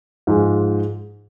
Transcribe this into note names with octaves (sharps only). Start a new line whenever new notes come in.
G#2 F3 G#3